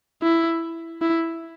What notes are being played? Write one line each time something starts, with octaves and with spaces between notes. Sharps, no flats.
E4
E4